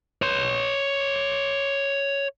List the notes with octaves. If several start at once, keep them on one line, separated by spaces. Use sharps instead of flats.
C#5 C6